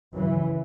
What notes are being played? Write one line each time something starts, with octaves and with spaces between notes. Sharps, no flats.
F#2 C#3 E3